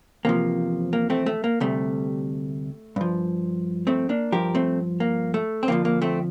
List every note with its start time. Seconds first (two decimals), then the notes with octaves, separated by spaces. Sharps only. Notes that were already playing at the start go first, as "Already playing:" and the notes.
0.25 E2 C3 F3 A#3
0.93 A#3
1.10 A3 C4
1.26 A3
1.44 A#3
1.60 D2 C3 G3 A3
2.96 G2 F3
3.87 A3 C4
4.09 A#3 D4
4.32 G2 F3 G4 A#4
4.55 A3 C4
5.00 A#3
5.34 A3
5.63 C4
5.68 F2 D3 F3 A#3
5.85 A#3
6.02 A3 C4